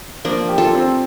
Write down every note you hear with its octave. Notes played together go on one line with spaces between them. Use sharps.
F3 A#3 D4
G4
F4 A4
C4